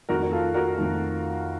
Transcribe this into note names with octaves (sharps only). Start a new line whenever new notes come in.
F2 D#3 A3 F#4 A#4
A#4
F4 A4
F#4 A#4
F2 D#3 A3